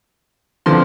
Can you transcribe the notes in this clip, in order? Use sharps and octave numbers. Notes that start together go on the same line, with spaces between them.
D3 F3 C4 C6